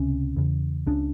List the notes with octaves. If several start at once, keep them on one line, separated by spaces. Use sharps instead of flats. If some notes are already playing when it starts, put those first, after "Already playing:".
Already playing: C#2 C3 C#4
E2 C#3
C#2 C#3 D4